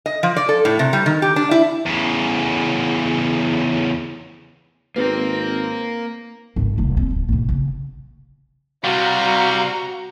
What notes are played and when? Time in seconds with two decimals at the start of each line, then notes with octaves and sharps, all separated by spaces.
0.06 D#5
0.23 F3
0.36 D5
0.49 A4
0.65 A2
0.79 C3
0.93 G3
1.06 D#3
1.22 G4
1.36 D4
1.51 E4
1.86 E2 C#3
4.96 G#1 A#3 C4 A#4 B4
6.56 G#1 A2
6.78 D#1 C2
6.97 C4
7.10 D1
7.29 A1 B2
7.49 C#3
8.84 C3 G3 F#4 F5 A#5